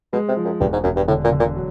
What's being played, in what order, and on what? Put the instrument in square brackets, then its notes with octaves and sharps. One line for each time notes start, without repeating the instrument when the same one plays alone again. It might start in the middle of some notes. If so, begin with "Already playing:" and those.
[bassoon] B2 [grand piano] G#3
[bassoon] C3
[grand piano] F3
[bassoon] F#2
[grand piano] E1 [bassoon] G2
[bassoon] G#2
[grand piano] E1 [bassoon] F#2
[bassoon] G2
[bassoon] A2 [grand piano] D3
[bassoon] A#2
[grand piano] D3
[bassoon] A#2
[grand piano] F#3